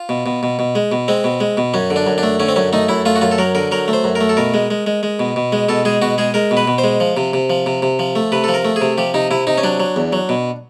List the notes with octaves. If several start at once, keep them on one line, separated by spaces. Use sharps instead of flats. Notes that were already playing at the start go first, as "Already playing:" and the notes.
Already playing: F4
B2
B2
B2
B2
G#3
B2
G#3 C4
B2
G#3
B2
F#2 C#4
D3
D4
F#2
D4
A3
D3 C#4
C4
F#2 C#4
A3 D#4
F#2 E4
A3 F4
F#4
F#2 F4
A4
F#3 A#4
D3 A#4
F#3 A#4
A3
C5
F#2
A#4
A3
A4
B2 A#4
G#3
G#3
G#3
G#3
B2
B2
G#3
B2 A4
G#3 G#4
B2 F#4
G#3 G#4
G#3 A#4
B2
B4
B2
C5
G#3
F3
C3
C3
F3
C3
C3
F3
A3
C3 B4
F3 A4
A#4
A3
G#4
C3
F3 G4
C3 D#4
C3 E4
C3 D#4
C#4
F#3 D4
F#3
E2
F#3
B2